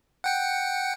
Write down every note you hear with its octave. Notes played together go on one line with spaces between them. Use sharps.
F#5 G5 C#7